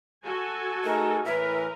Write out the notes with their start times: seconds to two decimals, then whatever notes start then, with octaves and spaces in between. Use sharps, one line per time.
0.24 F#4 A4 G#5
0.84 A3 D#4 G#4 A#4
1.25 A2 E3 A#4 B4 E5